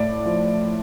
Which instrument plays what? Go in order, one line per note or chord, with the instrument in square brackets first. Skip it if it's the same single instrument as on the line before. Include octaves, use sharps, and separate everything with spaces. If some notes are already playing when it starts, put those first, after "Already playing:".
Already playing: [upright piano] A2 D5
F3